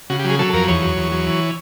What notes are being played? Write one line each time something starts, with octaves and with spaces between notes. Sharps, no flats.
C#3 F#4
G4
F#3
G#4
F#3 A4
F2 A#4
E2 C#5
F#3
E2
F#3
E3